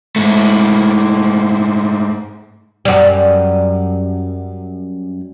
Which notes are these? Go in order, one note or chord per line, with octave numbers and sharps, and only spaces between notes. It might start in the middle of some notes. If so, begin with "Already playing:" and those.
G#2 A3
F#2 G3